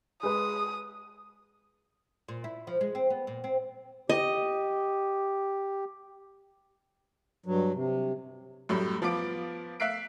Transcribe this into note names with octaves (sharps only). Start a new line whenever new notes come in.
G#3 B4 D#6
A#2
E4
F3
G#3
C4
B3
A#2
C4
G4 D#5
G2 F#3
C3
F#2 A2 F#3 G3
F3 B3 F4 D6 D7
E5 F5 F#6 B6 C7 D7